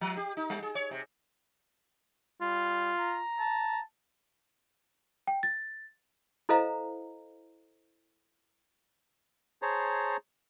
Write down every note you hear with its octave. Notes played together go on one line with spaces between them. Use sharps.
F3
G4
D#4
G3
G#4
C#5
C3
G3 F4
A#5
A5
G5
A6
E4 A4 C5 D#5 F5 A#5
G#4 C5 C#5 A5 A#5